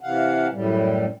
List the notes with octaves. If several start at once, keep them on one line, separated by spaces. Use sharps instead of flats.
C3 E3 F5 F#5
F#2 A2 G3